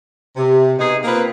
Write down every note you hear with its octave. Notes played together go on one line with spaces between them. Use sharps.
C3
B2 D#4 G#4
A#3 C4 F4 B4